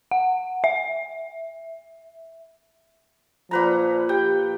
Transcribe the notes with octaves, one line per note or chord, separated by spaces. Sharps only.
F#5
E5
A#2 F3 B4 A#5
G4 G5